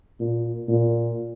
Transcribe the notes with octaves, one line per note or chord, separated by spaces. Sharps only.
A#2
A#2